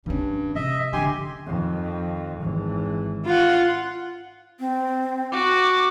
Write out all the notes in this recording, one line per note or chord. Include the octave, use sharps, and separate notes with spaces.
G2 D#3 C#4
C3 G#3 D#5 E5
D3 D4 G4 G#5 C6
F2 D#3
G#1 E3
F4 F#5
C4
F#4 D6